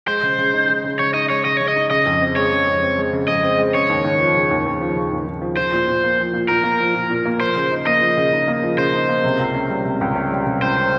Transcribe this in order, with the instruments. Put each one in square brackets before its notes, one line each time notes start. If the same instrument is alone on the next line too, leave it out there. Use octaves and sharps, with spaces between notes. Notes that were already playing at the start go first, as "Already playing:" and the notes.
[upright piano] G#3 [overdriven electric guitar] C5
[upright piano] C#3
C#3
D#4
G#3
C#3
[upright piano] C#3 [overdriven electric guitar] C#5
[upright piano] D#4 [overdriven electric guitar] D#5
[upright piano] G#3 [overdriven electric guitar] C#5
[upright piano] C#3 [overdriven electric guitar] D#5
[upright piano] C#3 [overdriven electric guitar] C#5
[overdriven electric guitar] D#5
[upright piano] D#4
[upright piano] C#3 [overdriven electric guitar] D#5
[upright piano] F2
C4
[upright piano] G#3 [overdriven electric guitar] C#5
[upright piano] C#3
F2
C4
G#3
C#3
[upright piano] F2 [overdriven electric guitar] D#5
[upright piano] C4
G#3
[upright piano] C#3 [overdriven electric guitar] C#5
[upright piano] D#2
D#2
F3
C#3
D#2
D#2
F3
C#3
D#2
D#2
F3
[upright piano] F3 [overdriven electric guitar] C5
[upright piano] A#2
A#2
A#3
F3
A#2
[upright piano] A#2 [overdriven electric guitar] A#4
[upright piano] A#3
F3
A#2
A#2
A#3
[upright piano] F3 [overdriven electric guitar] C5
[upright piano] C#3
D#4
[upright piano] A#3 [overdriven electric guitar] D#5
[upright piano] F3
C#3
D#4
A#3
F3
[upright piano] C#3 [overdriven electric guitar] C5
[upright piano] D#4
A#3
C3
C#2
C#4
G3
C3
C#2
C#4
G3
C3
[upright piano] C#2 [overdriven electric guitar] C5
[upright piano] C#4